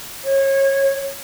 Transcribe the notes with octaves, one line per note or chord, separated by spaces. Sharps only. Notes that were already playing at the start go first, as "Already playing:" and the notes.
C#5